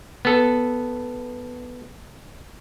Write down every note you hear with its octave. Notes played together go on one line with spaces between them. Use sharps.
B3 A4